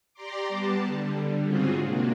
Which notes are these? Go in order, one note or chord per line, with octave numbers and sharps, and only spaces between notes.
G4 D5 A#5 C6 D6
G3 B3 A5
D3 G3
G#2 C#3 C4 F4 F#4 G#4
C3 A#3 D4